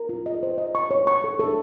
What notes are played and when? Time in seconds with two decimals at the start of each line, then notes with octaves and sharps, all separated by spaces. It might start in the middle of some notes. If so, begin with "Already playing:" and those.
Already playing: A#4
0.09 F4
0.26 D#5
0.43 C5
0.58 D#5
0.75 C#6
0.91 C#5
1.07 C#6
1.24 A4
1.40 A4